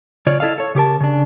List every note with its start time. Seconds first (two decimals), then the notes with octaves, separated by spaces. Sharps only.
0.26 C#3 F4 C#5 D5
0.40 E4 A4 D#5 F5
0.58 A4 C#5
0.75 C#3 G4 A#4 A5
1.00 C#3 D4